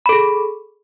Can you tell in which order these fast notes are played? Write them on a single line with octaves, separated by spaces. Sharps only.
B5 A4 G#4